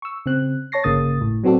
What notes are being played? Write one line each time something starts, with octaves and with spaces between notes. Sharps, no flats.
C#6 E6
C#3 C4 F#6
C#5 A5 C#6 A#6 C7
G1 C#3 A#3 D#6 A6
A2
F#3 B3 C4 F#4 A4 D5